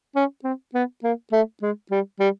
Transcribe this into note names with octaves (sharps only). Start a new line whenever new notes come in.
C#4
C4
B3
A#3
A3
G#3
G3
G3